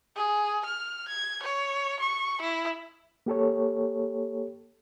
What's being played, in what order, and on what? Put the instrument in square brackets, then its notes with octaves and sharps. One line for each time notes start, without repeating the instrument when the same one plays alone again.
[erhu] G#4
F6
G#6
C#5
C#6
E4
[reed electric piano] A#3 G4 A4 C#5